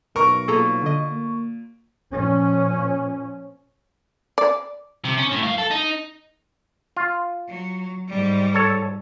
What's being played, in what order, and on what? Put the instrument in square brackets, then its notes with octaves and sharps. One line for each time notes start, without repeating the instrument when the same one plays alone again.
[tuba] B1 [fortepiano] A#4 [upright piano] C#6
[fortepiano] A#2 [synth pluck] G#4 A4 A#5
[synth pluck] D3 D#5
[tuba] A#3
[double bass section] A#2 F3 C#4
[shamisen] D5
[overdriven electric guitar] C3
C#4
A2
F#2 F5
A4
D#4
[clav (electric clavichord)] F4
[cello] F#3
G#2 G3
[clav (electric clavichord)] A4 C#5